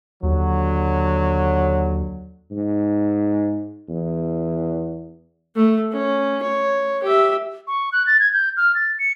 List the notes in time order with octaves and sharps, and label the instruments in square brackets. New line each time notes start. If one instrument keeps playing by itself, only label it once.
[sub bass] D#2 [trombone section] D3 F#3
[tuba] G#2
E2
[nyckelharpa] A3
C#4
C#5
G4 E5
[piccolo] C#6
F#6
A6
G#6
G6
F6
A6
C#7